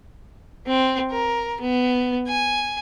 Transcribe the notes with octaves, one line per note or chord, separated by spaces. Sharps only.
C4
A#4
B3
G#5